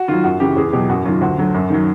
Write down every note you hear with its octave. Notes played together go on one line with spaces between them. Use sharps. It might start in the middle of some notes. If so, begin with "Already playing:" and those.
Already playing: F#4
D#3 F#3 F4
F#2 F#4
C#3 E3 G4
E2 G#4
B2 F#3 G4
F#2 F#4
D#3 F#3 F4
D2 F#4
D3 F#3
F#2
D#3 F#3